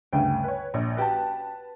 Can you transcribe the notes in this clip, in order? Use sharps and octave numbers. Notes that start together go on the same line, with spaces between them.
D2 G2 C#3 G5 G#5
B4 C#5
A#1 C#5
C#4 F#4 G4 B4 A5